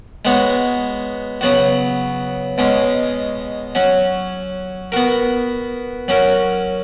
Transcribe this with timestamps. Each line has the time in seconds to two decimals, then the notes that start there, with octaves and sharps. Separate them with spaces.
0.25 G#3 B3 F#4 C#5
1.41 C#3 F#3 B3 F#4
2.58 B2 G#3 C#4
3.75 F#3 C#4 F#4
4.92 B3 F#4 A#4
6.08 F#3 C#4 F#4 A#4